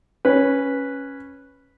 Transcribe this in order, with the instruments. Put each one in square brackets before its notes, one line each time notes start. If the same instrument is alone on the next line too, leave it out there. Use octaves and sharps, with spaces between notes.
[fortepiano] C#4 B4